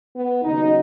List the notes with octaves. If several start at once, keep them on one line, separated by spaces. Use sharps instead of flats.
B3
D#2 C#3 F#3 D#4